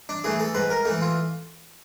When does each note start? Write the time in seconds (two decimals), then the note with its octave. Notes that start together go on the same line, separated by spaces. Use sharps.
0.09 D4
0.24 E3 A3 G#4
0.40 A4
0.55 G#2 B4
0.70 A#4
0.85 E3 A3
1.01 F4